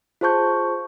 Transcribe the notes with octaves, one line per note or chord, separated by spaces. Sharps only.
F4 G#4 C5 A5 C#6 G6